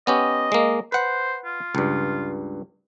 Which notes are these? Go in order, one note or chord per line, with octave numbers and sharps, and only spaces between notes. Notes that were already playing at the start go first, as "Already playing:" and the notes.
B3 C#4 G4 D#5
G#3 A#3
B4 C5 F#5
F4
C#2 G2